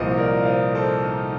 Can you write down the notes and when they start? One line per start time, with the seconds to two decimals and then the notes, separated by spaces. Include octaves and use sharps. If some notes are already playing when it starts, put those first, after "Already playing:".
Already playing: C2 A#2 F3 C5 D#5
0.17 A#4 D5
0.42 F5
0.46 C5 D#5
0.75 A4 C5
1.04 D#4